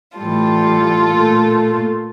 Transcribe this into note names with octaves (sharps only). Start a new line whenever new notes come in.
A2 E3 G3 F4 A4
A#2 A3